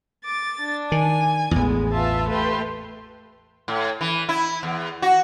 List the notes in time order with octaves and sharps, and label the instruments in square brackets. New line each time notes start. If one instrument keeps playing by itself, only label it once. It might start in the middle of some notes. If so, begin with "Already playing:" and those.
[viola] D6 [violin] A6
[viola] D4
[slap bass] D#3 [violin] G#5
[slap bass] A1 E2 [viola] G#3 B3
[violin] F4 B4 [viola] E5 A5
[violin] A3 G4 [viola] B4 C6
[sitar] A2
E3
E4
E2
F#4